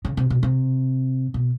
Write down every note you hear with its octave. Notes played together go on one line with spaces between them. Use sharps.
C#3
C3
B2
C3
B2